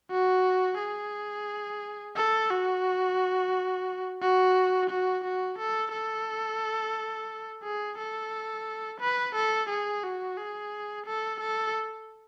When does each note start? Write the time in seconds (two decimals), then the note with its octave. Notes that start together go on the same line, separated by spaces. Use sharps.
0.11 F#4
0.79 G#4
2.16 A4
2.50 F#4
4.22 F#4
4.90 F#4
5.24 F#4
5.59 A4
5.93 A4
7.63 G#4
7.99 A4
9.00 B4
9.35 A4
9.69 G#4
10.03 F#4
10.37 G#4
11.06 A4
11.40 A4